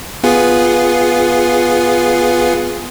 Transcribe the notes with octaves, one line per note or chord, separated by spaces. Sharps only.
B3 F4 G#4